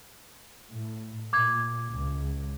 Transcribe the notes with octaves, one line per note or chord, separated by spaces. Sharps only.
A2
A#2 D6 G#6
C#2